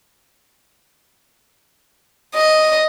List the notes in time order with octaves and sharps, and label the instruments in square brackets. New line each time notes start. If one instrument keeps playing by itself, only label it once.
[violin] D#5